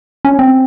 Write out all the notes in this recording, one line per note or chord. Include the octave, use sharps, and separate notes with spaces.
C#4
C4